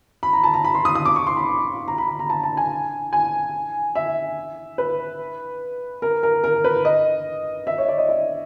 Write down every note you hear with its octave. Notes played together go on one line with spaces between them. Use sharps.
B5
A#5
A5
A#5
B5
C6
D#6
D#6
D6
C#6
C6
B5
A#5
B5
B5
A#5
A5
A5
G#5
G#5
E5
B4
A#4
A#4
A#4
B4
D#5
E5
C#5
D5
D#5
E5